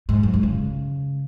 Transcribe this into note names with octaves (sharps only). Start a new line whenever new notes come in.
G#2
F#2
G#3
C#3